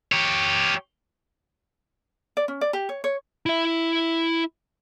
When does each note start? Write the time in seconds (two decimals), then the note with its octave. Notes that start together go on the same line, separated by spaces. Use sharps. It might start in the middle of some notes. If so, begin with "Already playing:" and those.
0.12 G4 C#5
2.37 D5
2.48 C#4
2.61 D5
2.73 G4
2.89 C#5
3.04 C#5
3.46 E4 E5